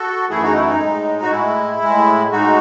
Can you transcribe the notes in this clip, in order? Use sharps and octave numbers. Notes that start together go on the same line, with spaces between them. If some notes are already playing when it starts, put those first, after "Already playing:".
Already playing: F#4 A4
F#2 E3 A3 E4 G#4
D#4 F#4
E4
D#4
A2 G#3
F#4
A2 G#3 E4
A2 G#3
A2 G#3 D#4 F#4